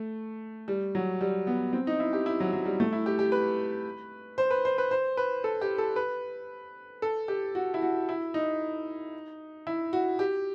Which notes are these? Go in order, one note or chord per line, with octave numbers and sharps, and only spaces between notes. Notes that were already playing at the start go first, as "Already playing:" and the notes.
Already playing: A3
G3
F#3
G3
B3
C4
D#4
E4
G4
E4
F#3
F#3
G3
A3
E4
G4
G4
B4
C5
B4
C5
B4
C5
B4
A4
G4
A4
B4
A4
G4
F#4
E4
F#4
E4
D#4
E4
F#4
G4